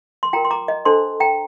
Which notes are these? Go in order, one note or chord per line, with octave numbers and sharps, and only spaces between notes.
C6
F4 A#4 G5 A#5
C6
A#5 D6
D#5
D4 A4 C5 A5 C6
G5 A#5